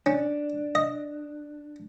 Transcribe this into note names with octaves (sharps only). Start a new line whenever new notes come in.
C#4 D4
D#5